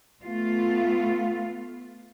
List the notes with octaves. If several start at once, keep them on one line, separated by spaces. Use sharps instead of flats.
A3 B3 F4